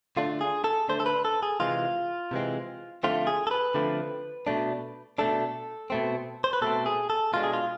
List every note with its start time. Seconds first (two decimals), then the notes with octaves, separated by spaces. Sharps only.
0.17 D3 A3 D4 F4
0.41 G#4
0.64 A4
0.88 D3 A3 D4 C5
1.00 A4
1.06 B4
1.25 A4
1.43 G#4
1.60 C3 E3 G#3 C4 F4
2.31 C3 E3 G#3 C4
3.03 D3 F3 A3 C4 F4
3.27 G#4
3.47 A4
3.51 B4
3.75 D3 F3 A3 C4
4.47 B2 A3 D4
5.18 B2 A3 D4 A4
5.90 B2 A3 C4
6.44 C5
6.53 B4
6.62 B2 A3 C4 A4
6.86 G#4
7.10 A4
7.33 B2 G#3 D4 F4
7.43 G#4
7.53 F4